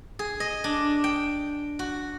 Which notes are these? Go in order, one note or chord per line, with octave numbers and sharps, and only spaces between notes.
G#4
D#5
D4
G5
F#4